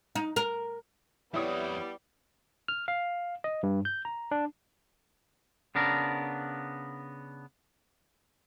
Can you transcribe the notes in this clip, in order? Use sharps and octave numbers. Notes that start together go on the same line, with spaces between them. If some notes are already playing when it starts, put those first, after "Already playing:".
D#4
A#4
F2 G3 B3 E4 C#5 D5 D#6
F6
F5
D#5
G2
G6
A#5
D4
C#3 B3 D4 A#4